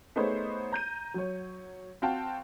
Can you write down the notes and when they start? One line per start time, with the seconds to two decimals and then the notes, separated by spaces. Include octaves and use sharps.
0.16 A3 B3 D#4 G#4 C5 C#5
0.72 A#5 G6 D#7
1.14 F#3 C#5
2.02 C4 F#4 F5 G5 A5